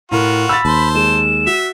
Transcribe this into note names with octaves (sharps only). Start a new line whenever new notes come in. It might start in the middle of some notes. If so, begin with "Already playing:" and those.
A2 F4 F#4 A#4
B5 E6 A6
D#2 C5 A5
G#3 E7
F#4 E5